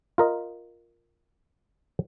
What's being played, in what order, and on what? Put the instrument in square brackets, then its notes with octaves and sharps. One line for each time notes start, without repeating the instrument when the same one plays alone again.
[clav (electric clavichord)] F4 A#4 D#5